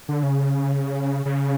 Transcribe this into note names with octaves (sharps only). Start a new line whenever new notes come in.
D3
C#3
C#3